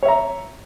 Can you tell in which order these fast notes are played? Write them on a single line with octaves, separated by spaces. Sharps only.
C#5 E5 A#5